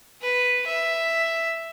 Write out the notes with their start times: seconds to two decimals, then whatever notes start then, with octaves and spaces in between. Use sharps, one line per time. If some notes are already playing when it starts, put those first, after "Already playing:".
0.22 B4
0.66 E5